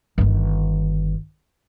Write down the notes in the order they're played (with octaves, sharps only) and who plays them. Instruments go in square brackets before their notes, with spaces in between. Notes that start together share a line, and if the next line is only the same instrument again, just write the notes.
[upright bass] G1 D#3